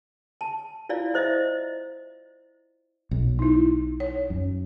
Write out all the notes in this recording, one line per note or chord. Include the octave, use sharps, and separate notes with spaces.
A5
E4 F4 D5 F5
E4 C5 D#5 E5
B1
D#4 E4
C#5
F#2